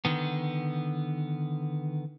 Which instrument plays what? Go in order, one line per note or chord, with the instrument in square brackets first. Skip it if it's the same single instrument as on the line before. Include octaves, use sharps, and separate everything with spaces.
[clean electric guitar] D3 D#3 B3